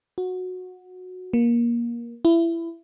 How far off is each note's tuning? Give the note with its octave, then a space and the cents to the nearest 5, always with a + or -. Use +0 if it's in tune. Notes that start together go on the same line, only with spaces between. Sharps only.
F#4 -15
A#3 +20
E4 +20